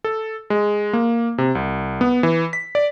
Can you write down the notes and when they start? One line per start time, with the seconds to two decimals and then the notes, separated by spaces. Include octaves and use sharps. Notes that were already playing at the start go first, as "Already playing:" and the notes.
0.04 A4
0.50 G#3
0.93 A#3
1.38 C3
1.55 C2
2.01 B3
2.23 E3
2.53 B6
2.75 D5